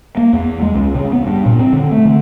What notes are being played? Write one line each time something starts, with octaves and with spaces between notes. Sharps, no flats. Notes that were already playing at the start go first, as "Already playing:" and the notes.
A#3
E2
G#3
C#2
C#3
B3
G2
A#2
C4
D3
A3
D3